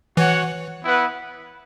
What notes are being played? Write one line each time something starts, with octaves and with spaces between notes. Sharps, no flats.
E3 F#4 C#5 F#5
B3 E4 B4 F#5